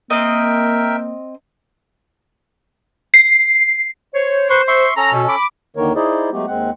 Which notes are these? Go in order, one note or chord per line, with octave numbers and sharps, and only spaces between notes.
A#3 C4 A#4 D#5 E5 G5
C7
C5 C#5
B4 C5 C6 C#6
E5 C6 C#6
C#4 A4 A#5
B2
B5 D6
D#2 D3 D#3 A#3 A#4 C#5
D#4 E4 G#4 C5 D5 D#5
F#3 G#3 A3 B3 G4
D#2 G#3 C4 F#5